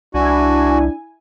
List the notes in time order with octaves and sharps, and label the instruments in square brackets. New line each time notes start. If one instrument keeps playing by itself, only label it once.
[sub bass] C2 [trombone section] D4 [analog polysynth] E4 G#5 [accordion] F#4